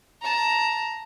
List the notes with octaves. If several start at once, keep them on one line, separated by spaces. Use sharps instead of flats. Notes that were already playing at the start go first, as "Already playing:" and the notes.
A5 A#5